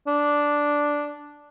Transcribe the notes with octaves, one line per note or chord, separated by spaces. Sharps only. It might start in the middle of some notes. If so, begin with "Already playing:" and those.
D4